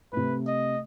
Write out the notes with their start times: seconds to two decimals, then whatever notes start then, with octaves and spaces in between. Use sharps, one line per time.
0.13 C3 A3 B4
0.47 D#5